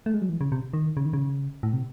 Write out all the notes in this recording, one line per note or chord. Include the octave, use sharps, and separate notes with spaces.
A3
G#3
F#3
E3
C#3
C3
D#3
C#3
D#3
C#3
A2
C3